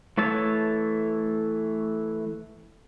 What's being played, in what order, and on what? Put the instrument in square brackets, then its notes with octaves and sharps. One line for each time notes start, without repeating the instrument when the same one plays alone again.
[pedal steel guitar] E3 A3 C#5 A5 E6